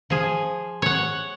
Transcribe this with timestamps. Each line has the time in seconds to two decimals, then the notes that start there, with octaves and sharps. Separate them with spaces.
0.10 F3 G#4
0.82 C#5 F#5